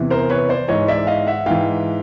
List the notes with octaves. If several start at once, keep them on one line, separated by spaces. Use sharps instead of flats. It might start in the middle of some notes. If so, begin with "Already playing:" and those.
Already playing: E2 C3 E3
A#4 C5
B4 C#5
C5 D5
G#2 E3 C#5 D#5
D5 E5
D#5 F5
E5 F#5
G#2 E3 F5 G5